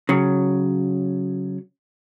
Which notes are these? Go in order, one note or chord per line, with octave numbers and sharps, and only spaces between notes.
C#3 F#3